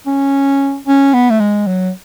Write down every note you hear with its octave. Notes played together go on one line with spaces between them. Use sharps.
C#4
C#4
B3
A3
G#3
F#3